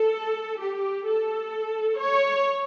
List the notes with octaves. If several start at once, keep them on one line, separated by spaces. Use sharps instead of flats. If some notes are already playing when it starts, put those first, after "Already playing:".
Already playing: A4
G4
A4
C#5